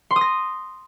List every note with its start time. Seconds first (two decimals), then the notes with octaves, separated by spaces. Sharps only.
0.11 C6
0.16 D#6
0.21 A#6